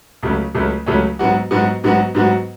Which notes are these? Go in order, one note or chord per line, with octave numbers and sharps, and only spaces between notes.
C#2 C#3 F#3 A3 C#4
C#2 C#3 F#3 A3 C#4
C#2 C#3 F#3 A3 C#4
G#2 F#3 B3 F#4
G#2 F#3 B3 F#4
G#2 F#3 B3 F#4
G#2 F#3 B3 F#4